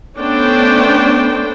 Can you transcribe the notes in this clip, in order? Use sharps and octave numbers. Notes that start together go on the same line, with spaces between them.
A3 B3 C#4 D4 C5 G5